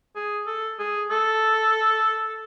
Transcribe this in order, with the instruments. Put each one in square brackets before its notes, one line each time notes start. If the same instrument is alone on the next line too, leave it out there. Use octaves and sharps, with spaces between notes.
[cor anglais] G#4
A4
G#4
A4